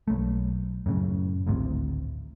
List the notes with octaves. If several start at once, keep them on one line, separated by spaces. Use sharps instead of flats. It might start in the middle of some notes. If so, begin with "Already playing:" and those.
B1 A3
F#2 A2 C#3
G#1 D2 A2 C3